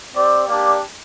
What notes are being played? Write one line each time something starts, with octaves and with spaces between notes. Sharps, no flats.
C4 G4 D5
A#3 D4 G4 D5